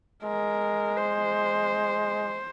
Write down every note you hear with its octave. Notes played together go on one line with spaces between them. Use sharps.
G#3 A#4
C5